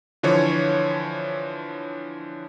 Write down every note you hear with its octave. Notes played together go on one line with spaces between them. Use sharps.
D3 E3 F3 C#5